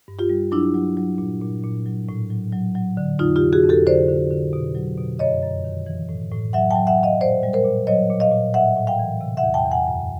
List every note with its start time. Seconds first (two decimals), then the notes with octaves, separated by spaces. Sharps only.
0.08 G2
0.19 F4 G4
0.30 G3
0.52 F#3 D4 E4
0.74 F#3
0.97 F#3
1.18 A#2
1.41 A#2
1.64 A#2
1.86 F#3
2.09 A2
2.30 F#3
2.52 F#3
2.75 F#3
2.97 D3
3.19 F2 D#4 F4
3.36 F4 G4
3.41 C3
3.53 F#4 G#4
3.64 F2
3.69 G4 A4
3.86 D3 C5 D5
4.08 D3
4.30 D3
4.53 B2
4.75 F#3
4.98 B2
5.19 F#2 C#5 D#5
5.42 F#2
5.64 D#3
5.86 E3
6.09 A2
6.31 A2
6.53 F#3 E5 F#5
6.71 G5 A5
6.75 F#3
6.87 E5 F#5
6.98 F#3
7.03 D#5 F5
7.21 A#2 C5 D5
7.43 G3
7.53 A#4 C5
7.65 A#2
7.87 F#3 C#5 D#5
8.10 A#2
8.20 D#5 F5
8.32 A#2
8.54 A2 E5 F#5
8.76 A2
8.87 F5 G5
8.99 E3
9.21 C3
9.37 E5 F#5
9.43 E2
9.54 G5 A5
9.65 E2
9.71 F#5 G#5
9.88 F#2